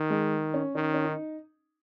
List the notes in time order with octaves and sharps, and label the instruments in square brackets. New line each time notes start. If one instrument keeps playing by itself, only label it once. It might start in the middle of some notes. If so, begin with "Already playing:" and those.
Already playing: [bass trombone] D#3
[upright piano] G#3
C#4
[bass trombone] D#3 [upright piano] C#4
[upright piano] C#4
D#4